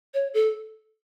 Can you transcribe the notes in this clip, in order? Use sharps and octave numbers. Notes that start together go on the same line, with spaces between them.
C#5
A4